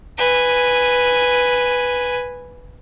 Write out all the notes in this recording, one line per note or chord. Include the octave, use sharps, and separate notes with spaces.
B4 G#5